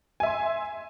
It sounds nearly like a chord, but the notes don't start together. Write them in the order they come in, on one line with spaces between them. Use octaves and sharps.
G#5 E5 C6